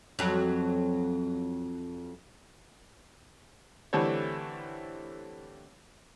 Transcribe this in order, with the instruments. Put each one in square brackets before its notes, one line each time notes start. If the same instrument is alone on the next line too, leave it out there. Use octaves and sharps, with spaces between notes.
[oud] F2 F#3
[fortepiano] D3 E3 G3 A3 C4 C#5